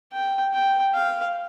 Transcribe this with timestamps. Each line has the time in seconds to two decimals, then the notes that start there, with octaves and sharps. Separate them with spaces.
0.13 G5
0.54 G5
0.94 F5